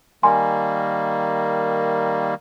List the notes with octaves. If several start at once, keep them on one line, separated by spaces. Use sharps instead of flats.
D#3 G3 A#3 G#5 C6